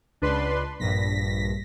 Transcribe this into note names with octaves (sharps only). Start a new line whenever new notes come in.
C#2 D4 B4 C6
A#1 G2 A#6 B6